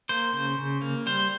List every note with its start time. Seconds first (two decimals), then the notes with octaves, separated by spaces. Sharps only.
0.09 A#3 C5
0.33 C#3
0.59 C#3
0.82 A#3
1.06 G3 C5